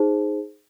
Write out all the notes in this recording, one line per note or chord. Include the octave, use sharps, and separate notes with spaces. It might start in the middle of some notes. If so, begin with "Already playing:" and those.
Already playing: D#4 G#4 C5